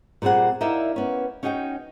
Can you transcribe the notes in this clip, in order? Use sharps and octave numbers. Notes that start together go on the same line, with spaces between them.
A#2 G3 C4 G#4 F#5
D#4 E4 A#4 D5 E5 F5
B3 C#4
C#4 D#4 F#4 D#5 F5 G5